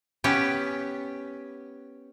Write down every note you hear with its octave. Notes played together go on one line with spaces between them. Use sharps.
B3 C#4 G4